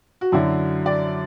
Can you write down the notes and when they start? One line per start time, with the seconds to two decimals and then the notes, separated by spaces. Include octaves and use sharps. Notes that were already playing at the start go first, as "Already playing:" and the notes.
0.21 F#4
0.32 F#2 D3 F#3 E4
0.86 D5